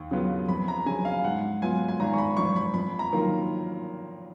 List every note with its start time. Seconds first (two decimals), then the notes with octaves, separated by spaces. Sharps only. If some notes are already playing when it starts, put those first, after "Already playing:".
Already playing: D#2
0.11 C#3 F#3 B3 F4
0.48 F2 B5
0.68 A#5
0.86 C#3 F#3 G#5
1.05 F5
1.24 G#2 F#5
1.62 F#3 B3 F4 G#5
1.88 G#5
2.00 G#1 A#5
2.13 C#6
2.18 B5
2.37 F#2 F3 C#6
2.56 B5
2.74 F2 B5
2.99 A#5
3.12 D#3 F#3 A#3 F4